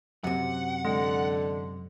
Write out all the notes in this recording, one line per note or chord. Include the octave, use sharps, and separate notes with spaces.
F#2 C3 F#5
D3 G#3